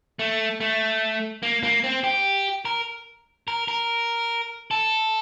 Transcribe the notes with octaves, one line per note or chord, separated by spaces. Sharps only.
A3
A3
A#3
A#3
C4
G4
A#4
A#4
A#4
A4